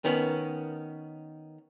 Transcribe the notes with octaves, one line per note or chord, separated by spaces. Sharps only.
D#3 B3 C#4